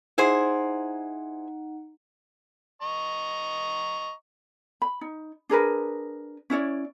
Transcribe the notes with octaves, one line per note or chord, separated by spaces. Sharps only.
D#4 E4 G#4 C5 F#5
D#5 A#5 C#6
B5
D#4
D4 G#4 A#4 B4
C#4 E4 C#5 D5